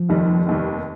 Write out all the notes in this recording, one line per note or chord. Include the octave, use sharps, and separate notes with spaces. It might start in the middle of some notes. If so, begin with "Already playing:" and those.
Already playing: F3
F1 D#2 D#3 G3
F1 D#2 D#3 G3